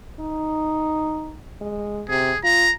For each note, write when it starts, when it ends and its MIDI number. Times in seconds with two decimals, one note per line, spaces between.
0.20 1.36 63
1.61 2.03 56
2.09 2.31 48
2.09 2.38 68
2.43 2.68 65
2.43 2.72 82